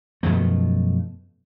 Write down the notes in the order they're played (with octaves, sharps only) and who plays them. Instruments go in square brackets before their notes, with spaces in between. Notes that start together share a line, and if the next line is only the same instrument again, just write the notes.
[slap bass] F#2 B2 F3 A3